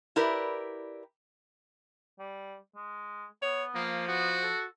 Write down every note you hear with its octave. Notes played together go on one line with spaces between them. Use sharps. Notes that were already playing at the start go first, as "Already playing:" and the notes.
E4 G4 A#4 B4 D5
G3
G#3
B3 C#5
F3 A#3
B3 F#4
A4